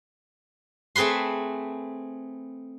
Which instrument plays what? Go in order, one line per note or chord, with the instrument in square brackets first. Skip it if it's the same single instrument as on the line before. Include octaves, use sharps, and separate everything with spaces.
[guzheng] A3 C4 G#4 B4 C6